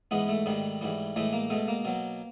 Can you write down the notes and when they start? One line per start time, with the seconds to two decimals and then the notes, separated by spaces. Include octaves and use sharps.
0.11 G#2 E3 G#3 B3
0.29 A3
0.46 G#2 D#3 G3
0.81 G#2 E3 G3
1.16 A2 E3 G#3 A3
1.33 A#3
1.50 B2 G#3 A3
1.68 A#3
1.85 B2 F#3